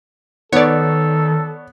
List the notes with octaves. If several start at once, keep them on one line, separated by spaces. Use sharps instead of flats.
D#3 B3 A4 C#5 D5